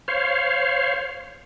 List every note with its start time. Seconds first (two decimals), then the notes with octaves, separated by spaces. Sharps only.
0.08 C5 C#5 F5